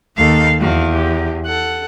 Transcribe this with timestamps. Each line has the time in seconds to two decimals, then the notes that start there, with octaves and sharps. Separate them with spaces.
0.17 D#2 A4 F5
0.60 E2 F#4 F5
0.94 G4
1.46 A4 F#5